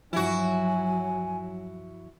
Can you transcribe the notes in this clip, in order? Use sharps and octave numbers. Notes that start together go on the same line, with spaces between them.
G2 F3 F#3 E4 F#4 G#5